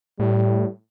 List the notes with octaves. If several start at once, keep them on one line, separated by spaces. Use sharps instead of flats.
A2 G3